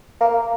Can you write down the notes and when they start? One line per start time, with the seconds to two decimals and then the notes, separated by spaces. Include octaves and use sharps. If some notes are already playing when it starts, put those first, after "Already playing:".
0.21 A#3